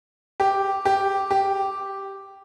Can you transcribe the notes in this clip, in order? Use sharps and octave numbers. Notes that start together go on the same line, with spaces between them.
G4
G4
G4